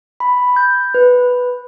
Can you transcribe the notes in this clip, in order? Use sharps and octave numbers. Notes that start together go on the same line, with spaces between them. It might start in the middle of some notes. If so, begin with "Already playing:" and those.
B5
G6
B4